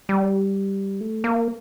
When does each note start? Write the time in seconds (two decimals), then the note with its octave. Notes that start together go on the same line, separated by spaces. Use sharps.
0.09 G3
1.01 A3
1.24 A#3